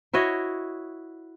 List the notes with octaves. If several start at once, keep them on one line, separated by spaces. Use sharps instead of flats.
E4 F#4 C#5 D#5